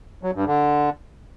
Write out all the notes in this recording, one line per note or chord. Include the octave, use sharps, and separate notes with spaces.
F#3
G2
D3